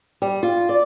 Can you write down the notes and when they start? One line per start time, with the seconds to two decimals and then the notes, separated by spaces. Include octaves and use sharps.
0.22 G3
0.43 F4
0.69 D5